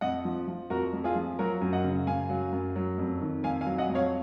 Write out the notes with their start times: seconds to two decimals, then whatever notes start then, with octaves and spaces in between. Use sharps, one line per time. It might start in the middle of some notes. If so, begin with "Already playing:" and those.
0.01 F2 D#5 F#5
0.25 F3
0.48 F3
0.70 F2 F#4 A#4
0.93 F2
1.04 F4 G#4
1.15 F3
1.39 F#3 F#4 A#4
1.61 F#2
1.73 D#5 F#5
1.84 C#3
2.07 F#2 F5 G#5
2.30 F#3
2.53 F#2
2.76 F#3
2.98 F2
3.21 D#3
3.44 F2 F5 G#5
3.61 F5 G#5
3.66 F#3
3.78 D#5 F#5
3.90 F2
3.95 C#5 F5